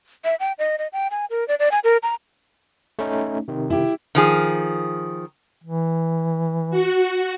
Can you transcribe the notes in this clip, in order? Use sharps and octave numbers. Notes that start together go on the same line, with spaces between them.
E5
G5
D#5
D#5
G5
G#5
A#4
D5
D5
G#5
A#4
A#5
A3 C#4 D#4
C3 D#3
E4 G4
D#3 F3 G#4
E3
F#4